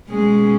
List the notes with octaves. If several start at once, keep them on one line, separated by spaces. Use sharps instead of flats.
B2 G#3 A#3 C#4 G#4